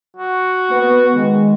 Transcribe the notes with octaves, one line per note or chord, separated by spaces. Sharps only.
F#4
B3
D#3 G#3